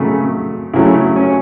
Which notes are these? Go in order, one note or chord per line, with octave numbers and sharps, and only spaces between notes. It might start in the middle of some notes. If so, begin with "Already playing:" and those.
Already playing: C#3 F#3 A3
C#3 F#3 A3 E4
C#4